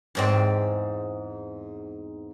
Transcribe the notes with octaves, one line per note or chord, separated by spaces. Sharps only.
E2 G#2 C4